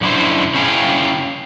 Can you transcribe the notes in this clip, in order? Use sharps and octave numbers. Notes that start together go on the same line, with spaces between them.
F#2 C#3 D4 E4 C5
C#3 E4 G#4 F5 G5